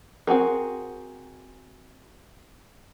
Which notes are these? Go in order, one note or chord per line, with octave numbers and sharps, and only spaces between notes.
C4 F#4 G#4 A#4